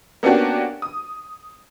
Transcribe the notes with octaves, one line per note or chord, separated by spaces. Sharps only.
A#3 B3 C#4 D4 F#4 G4
D#6